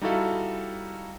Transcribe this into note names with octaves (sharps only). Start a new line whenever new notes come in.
G3 D#4 E4 F#4 A4 F5